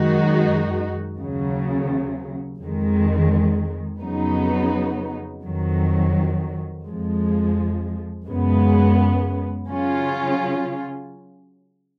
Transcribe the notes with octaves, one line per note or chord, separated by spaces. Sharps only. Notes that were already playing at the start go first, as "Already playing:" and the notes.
Already playing: F#2 D#3 G#3 D#4 F#4
D#2 C#3 F#3
F2 D#3 G#3
F2 C#3 F#3 B3 D#4
F2 D#3 F#3
F2 F3 G#3
F#2 C#3 G#3 B3
C#3 F#3 C#4 F4